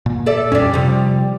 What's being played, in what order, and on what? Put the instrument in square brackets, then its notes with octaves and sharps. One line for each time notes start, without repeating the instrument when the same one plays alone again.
[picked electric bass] A#2
[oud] A4 D5 E5
[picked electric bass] F2 C#4 [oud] G3 D4
[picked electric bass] C3 [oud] F3 G3